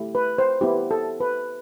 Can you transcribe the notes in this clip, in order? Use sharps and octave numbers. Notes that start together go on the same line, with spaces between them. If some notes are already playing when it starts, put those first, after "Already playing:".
Already playing: A3 E4 G4
B4
C5
B3 E4 G4
A4
B4